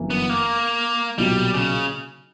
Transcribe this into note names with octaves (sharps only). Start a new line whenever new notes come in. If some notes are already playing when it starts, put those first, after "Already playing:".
Already playing: G1 F#2 E3 A#3
B3
A#3
B1 A#2 F#3 G3
C#3